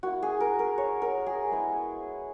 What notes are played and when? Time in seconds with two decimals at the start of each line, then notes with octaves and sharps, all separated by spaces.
0.03 A#3 E4 F#4
0.22 G#4
0.40 A#4
0.59 A#4
0.78 C#5
1.02 A#4
1.26 G#4
1.51 G#3 B3 E4